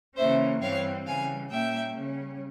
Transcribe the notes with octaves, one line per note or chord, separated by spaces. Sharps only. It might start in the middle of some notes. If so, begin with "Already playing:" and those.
C#3 E3 A#3 C#4 C5 E5
G2 E3 G3 C4 C#5 F5
C#3 E3 G3 F5 G#5
A#2 G3 A#3 C#4 E5 G5
C#3 G3 C#4